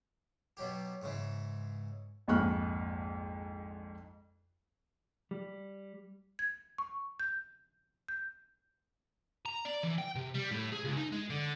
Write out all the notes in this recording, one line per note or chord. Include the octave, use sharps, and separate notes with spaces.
B2 F#3 G4
G#2 C#3 E3
A#1 F2 G#2 C#6 F6 F#6
G3
G#6
C#6
G6
G6
A#5
D5
E3
G5
C3
G3
A2
G#4
C#2
D#4
G#3
D3